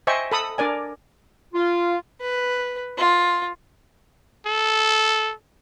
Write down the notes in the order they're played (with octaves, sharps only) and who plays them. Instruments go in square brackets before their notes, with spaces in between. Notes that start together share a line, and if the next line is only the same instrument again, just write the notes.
[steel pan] C5 D#5 E5 G5 G#5 C#6
A4 B5 D#6
D4 A#4 D5 G#5
[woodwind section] F4
[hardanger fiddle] B4
F4
[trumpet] A4